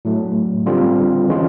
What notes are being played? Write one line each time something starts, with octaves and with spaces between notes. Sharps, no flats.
A2 F#3 A3
D3 G3 C4 F4
E3 G#3 C#4 F4